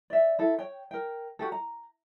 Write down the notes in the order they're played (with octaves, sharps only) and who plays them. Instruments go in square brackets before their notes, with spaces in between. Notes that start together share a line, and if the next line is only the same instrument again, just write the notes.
[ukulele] D5 E5
E4 A4
C#5 G5
A#4 G5
F#4 G4 A4
A#5